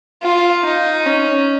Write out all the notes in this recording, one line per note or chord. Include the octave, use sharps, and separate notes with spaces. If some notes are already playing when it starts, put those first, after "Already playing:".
F4
D#4
C#4